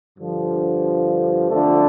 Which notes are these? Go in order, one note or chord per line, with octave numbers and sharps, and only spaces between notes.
G2 D3 F3
F2 D3 F3 A3 D4